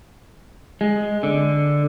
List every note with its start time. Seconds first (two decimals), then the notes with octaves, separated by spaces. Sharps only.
0.81 G#3
1.23 D3